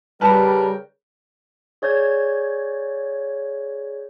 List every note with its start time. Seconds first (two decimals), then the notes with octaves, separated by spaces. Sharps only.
0.21 C#3 G3 A#4 B4 G5 A5 F6
1.82 G#4 C#5 D5 G6 G#6